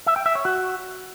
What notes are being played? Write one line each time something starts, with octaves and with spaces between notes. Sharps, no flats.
E5
G5
E5
C#5
F#4